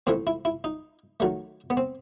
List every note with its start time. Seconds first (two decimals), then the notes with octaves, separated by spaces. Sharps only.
0.07 A2 E3 A3 C4
0.27 E4
0.45 E4
0.64 D#4
1.20 D#3 F#3 A3
1.70 B3
1.77 C4